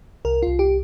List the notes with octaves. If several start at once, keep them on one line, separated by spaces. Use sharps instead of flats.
C2 A#4
C2 F4
G4